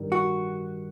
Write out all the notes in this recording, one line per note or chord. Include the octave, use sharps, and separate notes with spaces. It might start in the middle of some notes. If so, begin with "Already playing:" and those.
Already playing: A1 G2 D#3 G3
F#4